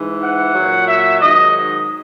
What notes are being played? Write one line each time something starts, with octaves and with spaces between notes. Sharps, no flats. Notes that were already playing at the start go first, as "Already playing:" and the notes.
Already playing: G#2 E3
F#5
A#2 F#3
E5
G#2 D#3 F#3 D#5